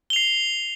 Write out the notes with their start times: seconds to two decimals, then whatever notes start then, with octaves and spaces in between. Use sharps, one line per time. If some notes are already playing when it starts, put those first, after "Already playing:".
0.10 G7
0.13 F7
0.16 C7